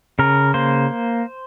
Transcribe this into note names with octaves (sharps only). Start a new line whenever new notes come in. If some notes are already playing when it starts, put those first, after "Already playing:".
C#3 A#4
A#3 C5